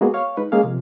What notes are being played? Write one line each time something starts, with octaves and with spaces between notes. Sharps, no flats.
G#3 A#3 B3 F#4 G#4
C#5 F5 C#6
G#3 D#4 B4
G#3 A#3 C#4 G#4 F5
C3 F3